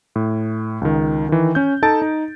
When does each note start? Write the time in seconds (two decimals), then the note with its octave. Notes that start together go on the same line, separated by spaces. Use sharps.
0.16 A2
0.81 C#2 D#3
1.29 D#3 E3
1.55 C#4 G6
1.82 D#4 A4 A5 A6 D7
2.02 D#4